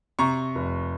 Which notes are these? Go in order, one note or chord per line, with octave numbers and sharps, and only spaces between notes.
C3 A#5 C#6
F1